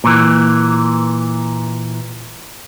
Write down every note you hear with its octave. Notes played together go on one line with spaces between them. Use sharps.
A#2 E3